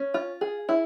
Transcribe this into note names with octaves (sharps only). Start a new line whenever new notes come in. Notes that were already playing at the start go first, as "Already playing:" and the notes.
Already playing: C#4
F4
G#4
E4